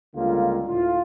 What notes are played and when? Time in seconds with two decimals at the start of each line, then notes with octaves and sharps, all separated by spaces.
0.13 C#2 D3 G3 A#3 F4
0.67 D2 A2 F4